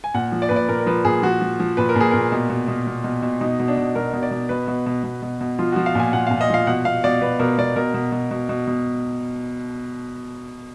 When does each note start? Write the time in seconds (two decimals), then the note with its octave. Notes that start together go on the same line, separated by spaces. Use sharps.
0.04 G#5
0.14 A#2 F#5
0.32 F3
0.42 D5
0.49 A#2 B4
0.56 D5
0.68 A#2 A#4
0.80 A#4
0.86 F3 B4
1.05 A#2 G#4
1.22 F3 F#4
1.41 F3
1.60 F3
1.77 A#2 B4
1.89 A#4
1.96 A#2 G#4
2.11 A#2 A#4
2.32 B2
2.50 B2
2.68 B2
2.87 B2
3.04 B2
3.22 B2
3.41 B2 D#4
3.60 B2
3.68 D4
3.77 B2
3.95 B2 A#4
4.13 B2
4.23 D5
4.31 B2
4.49 B2 B4
4.68 B2
4.86 B2
5.04 B2
5.22 B2
5.41 B2
5.59 F3 F4
5.72 F3 F#4
5.86 F5
5.95 A#2 G#5
6.13 A#2 F#5
6.27 A#2 F5
6.41 D#5
6.50 F3 F5
6.67 B2 F#5
6.85 B2 F5
7.04 B2 D5
7.22 B2 B4
7.39 B2 A#4
7.58 B2 D5
7.76 B2 A#4
7.94 B2
8.12 B2
8.31 B2
8.49 B2
8.67 B2